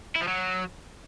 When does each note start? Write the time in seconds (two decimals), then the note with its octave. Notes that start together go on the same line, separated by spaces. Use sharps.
0.16 E4
0.22 F3
0.28 F#3